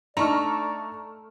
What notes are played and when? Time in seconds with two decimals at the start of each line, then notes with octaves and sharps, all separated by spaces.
0.17 A3 D4 D#4 D5 A#5 C#6 F6